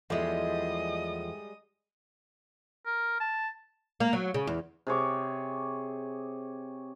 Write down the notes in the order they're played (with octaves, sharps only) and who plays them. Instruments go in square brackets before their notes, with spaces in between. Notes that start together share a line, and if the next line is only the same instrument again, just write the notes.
[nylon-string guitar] E2 F3 [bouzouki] G3 G#3 [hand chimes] A4 E5 [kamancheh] D#5 D#6
[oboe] A#4
A5
[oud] A#3
F#3
C#3
E2
[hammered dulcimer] C3 G#4 C#5 D6